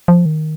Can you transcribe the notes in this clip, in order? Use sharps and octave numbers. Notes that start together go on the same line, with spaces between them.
F3
D#3